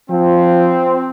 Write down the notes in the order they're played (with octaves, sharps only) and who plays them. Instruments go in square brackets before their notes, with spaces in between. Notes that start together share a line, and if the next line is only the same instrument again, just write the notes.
[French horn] F3 [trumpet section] C4